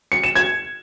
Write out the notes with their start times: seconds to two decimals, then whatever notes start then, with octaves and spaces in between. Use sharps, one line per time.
0.12 C#7
0.24 E7
0.35 G#6